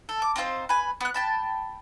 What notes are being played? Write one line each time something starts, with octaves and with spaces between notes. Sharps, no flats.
A4
D6
C4 D#4 F4 C5
B4 G#5
B3 F#6
G5 A5 B5